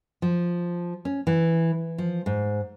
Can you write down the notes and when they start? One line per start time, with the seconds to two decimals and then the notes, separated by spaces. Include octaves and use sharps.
0.22 F3
1.05 C#4
1.27 E3
1.98 F3
2.26 G#2